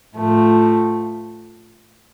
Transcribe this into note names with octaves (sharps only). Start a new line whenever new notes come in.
A2 F3 A3